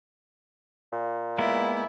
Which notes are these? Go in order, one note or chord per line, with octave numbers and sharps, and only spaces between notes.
A#2
G#3 A#3 B3 E4